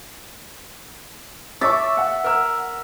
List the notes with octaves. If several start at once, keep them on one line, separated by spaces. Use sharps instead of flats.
E5 C#6 D6 A6
F#5
A#4 E6